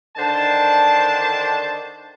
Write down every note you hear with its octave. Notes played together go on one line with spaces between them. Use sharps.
D3 D#3 D4 C5 A5